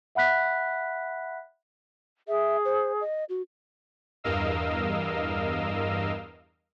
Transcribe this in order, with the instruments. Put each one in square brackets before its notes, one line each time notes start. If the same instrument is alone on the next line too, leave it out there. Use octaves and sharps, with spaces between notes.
[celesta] E5 F#5 B5 F#6 B6
[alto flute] G#4 [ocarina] E5
[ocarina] C5
D#5
F#4
[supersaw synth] E2 G2 A#4 D#5 F5 E6